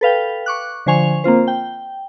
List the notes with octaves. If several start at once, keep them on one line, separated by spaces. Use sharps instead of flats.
A4 B4 F5 G5
C#6 D6 F#6
D3 F3 C5 G#5 C#6 F7
A#3 C4 F4 C5
G5